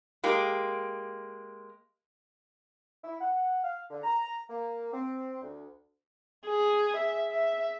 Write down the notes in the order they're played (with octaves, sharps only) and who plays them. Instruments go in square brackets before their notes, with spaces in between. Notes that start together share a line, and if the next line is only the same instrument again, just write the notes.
[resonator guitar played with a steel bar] G#3 A#3 G4
[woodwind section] E4
F#5
F5
D3
A#5
A#3
C4
D2
[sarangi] G#4
E5
E5